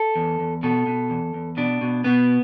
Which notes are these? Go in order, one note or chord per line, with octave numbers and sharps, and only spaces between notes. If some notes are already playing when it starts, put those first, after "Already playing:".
Already playing: A4
E2
E2
B2 A4
B2
E2
E2
B2 D4
B2
B2 B3